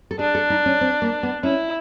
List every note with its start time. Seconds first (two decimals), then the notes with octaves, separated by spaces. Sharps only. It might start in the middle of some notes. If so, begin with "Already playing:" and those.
0.11 A4
0.19 D4 G#4
0.35 A4
0.50 D#4
0.66 C#4
0.81 C4
1.02 A#3
1.23 B3
1.43 C#4 E4